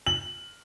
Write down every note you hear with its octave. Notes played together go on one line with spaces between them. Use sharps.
F#7